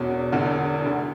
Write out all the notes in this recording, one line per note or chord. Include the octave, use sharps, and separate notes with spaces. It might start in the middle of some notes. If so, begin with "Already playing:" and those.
Already playing: E1 E2 B2 C#4
E1 E2 D3
D2 D3